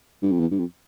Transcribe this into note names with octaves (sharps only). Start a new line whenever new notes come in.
G2
F2
E2
G2
F2